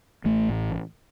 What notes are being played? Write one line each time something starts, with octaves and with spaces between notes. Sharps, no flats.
A1 A3
A2